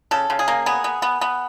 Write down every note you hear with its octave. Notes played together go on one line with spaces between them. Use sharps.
C#3 A4
C#3
G#4
A#3
B3 G#4
B3
B3
B3